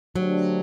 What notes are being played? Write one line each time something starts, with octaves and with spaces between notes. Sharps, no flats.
D3 F#3 A3 D4 G4 C5